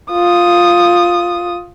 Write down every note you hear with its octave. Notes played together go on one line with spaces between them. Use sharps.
F4 D#6